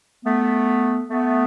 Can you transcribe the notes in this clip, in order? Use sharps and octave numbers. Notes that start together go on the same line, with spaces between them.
A3 B3
A3 B3